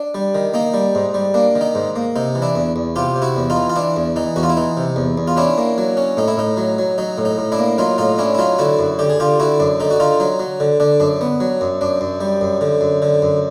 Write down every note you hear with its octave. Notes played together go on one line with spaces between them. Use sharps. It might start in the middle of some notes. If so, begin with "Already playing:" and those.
Already playing: D4
G3
D#3
A#3 D#4
G3
G#2
G3
A#3 D4
D#3
D#4
G#2
A#3
C3 D#4
E3
D4 E4
E2
E2
C3 F4 G4
C3
E4 F#4
E2
D#4 F4
E3
F4
E3 D4 E4
E2
E3 D#4
E2 F#4
F4
E4
E3 D#4
C3
E2
E2
F4
C#4 D4 E4
A#3
F#3
C#4
A2 D#4
E4
A2 D#4
F#3
F#3
F#3 D#4
A2
D#4
A2
D4 E4
A#3
F#3 D#4 F4
A2 D#4 F4
C#4 D4 E4
E4
F#3 D#4 F4
D3 E4 F#4
F#2
D3 G4
G#4
D3 F4 G4
D3 E4 F#4
F#2 D4
D3 D#4
F#4
D3 D#4 F4
F#3 D#4
F#3
D3
D3 D4
F#2 D4
B3
F#3
F#2
F#2 D4
F#2
G3
F#2
D3
F#2
D3
F#2